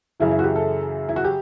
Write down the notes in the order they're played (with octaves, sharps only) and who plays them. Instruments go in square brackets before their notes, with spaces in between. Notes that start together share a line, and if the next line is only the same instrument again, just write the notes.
[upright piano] F#2 C#3 E3 E4
E4
F#4
G4
A4
E4
F#4
G4